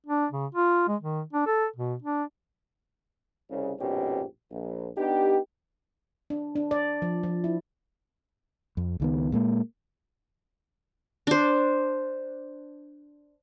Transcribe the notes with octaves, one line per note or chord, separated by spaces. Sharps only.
D4
C#3
F4
G#3
D#3
D4
A4
B2
D4
C2 C#3
A#1 F2 G#2 B2 C#4 G4
A#1
B3 D4 D#4 G4
D4
D4
D5
F3
F3
E4
F2
C#2 D#3 B3
A#2 G#3 A#3
D4 C5